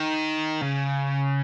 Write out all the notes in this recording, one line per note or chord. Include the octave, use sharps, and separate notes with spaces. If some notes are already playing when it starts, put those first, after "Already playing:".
Already playing: D#3
C#3